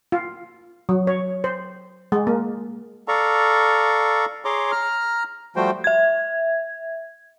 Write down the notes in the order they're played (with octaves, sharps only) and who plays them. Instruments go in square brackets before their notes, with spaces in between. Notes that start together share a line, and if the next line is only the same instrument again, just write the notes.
[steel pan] F4
F#3
C#5
C5
G#3
A#3
[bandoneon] A4 D5 F5 A#5 C#6
G#4 C#5 A#5 C6 D6
A#5 F6
F3 G3 A3 F#4 C5 G5
[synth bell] E5 G#6